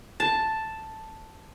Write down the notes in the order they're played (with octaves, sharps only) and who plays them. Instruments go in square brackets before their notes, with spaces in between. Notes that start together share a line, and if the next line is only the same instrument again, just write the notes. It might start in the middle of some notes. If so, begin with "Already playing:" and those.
[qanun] A5